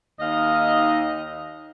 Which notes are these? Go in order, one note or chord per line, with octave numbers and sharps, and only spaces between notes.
D#2 D#4 D#5 F5